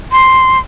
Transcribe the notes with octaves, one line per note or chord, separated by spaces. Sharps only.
C6